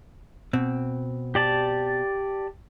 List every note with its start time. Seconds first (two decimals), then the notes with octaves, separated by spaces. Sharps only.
0.53 B2 C4
1.35 G4 D5 A5